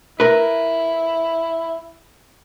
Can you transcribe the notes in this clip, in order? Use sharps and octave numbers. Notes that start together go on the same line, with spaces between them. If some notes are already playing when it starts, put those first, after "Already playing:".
E4 A#4 B4